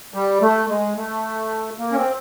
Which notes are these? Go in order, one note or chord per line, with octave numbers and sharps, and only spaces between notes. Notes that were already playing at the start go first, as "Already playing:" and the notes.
G3
A3
G#3
A3
A#3
C#4
C4